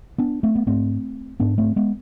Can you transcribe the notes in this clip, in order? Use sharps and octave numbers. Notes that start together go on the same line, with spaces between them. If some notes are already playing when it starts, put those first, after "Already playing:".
B3 D4
A3 C4
B3
G#2 A3 C4
G#2 B3 D4
A3 C4
G#3 B3